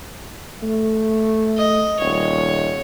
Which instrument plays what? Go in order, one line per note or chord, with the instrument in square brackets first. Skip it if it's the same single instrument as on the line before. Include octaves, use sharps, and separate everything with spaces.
[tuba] A3
[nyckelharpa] D#5
[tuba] D#1 [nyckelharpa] C#5